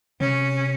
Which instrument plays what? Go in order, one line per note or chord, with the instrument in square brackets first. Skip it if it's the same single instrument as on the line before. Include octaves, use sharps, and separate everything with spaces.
[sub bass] C3 [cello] C#4